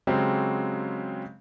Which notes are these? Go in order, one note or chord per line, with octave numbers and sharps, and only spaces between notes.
C#3 F#3 G#3 C4 G4